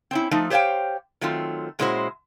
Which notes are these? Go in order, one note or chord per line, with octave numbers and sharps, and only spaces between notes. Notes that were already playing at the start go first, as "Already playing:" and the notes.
C4 C#4 E4
F3 A3 D#4
G4 C5 C#5 E5 F5 G5
D#3 F#3 A3 C4 F4
A#2 G#3 C#4 E4 F#4 C5